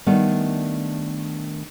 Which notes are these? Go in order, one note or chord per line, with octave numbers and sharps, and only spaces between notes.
D#3 G3 A3 B3 D4